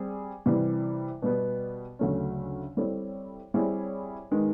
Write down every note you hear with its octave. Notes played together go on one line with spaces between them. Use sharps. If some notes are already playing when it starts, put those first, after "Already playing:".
Already playing: G3 C4 G#4
C3 E3 G3
B2 G3 B3
D2 C#3 F#3 A3 C#4
G3 C4 E4 A4 C#5
G3 C4 E4 G#4 C#5
D#3 G#3 B3